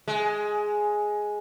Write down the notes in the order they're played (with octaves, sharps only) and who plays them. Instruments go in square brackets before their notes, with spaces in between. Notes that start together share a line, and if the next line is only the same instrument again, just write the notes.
[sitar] G#3